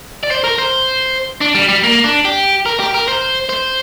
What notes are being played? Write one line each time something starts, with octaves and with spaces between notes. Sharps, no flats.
D5
C5
A#4
C5
D4
G3
G3
A#3
D4
G4
A#4
G4
A#4
C5
C5